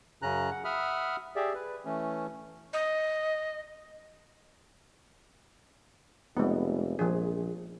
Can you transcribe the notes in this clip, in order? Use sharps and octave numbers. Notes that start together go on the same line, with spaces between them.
F#2 C#3 C#4 A#5 F#6
F#5
E5 F#5 B5 D#6 F6
G4 G#4 D5 E5
B4
E3 A3 C#4
D#5
F1 G#3 B3
A#1 F3 G#4